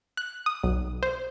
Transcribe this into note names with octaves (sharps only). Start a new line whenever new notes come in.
F#6
D#6
B1
C5